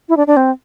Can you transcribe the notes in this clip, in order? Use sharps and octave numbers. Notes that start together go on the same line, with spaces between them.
E4
D4
D4
C4